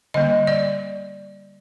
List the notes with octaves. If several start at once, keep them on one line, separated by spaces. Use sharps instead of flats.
D3 G3 A#3 D#5
D5